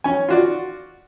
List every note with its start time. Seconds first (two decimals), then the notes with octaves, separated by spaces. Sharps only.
0.04 C#4 G#5
0.29 F4 F#4 D5